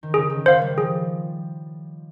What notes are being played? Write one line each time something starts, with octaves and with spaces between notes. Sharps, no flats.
D#3
C#3 G#4
D#3
C5 F5
G3
F3 G#4